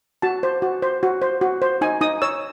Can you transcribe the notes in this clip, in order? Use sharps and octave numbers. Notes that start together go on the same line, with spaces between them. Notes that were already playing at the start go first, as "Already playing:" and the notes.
F#4 A5
C5
F#4
C5
F#4
C5
F#4
C5
D#4 G#5
D#4 D#6
C#5 E6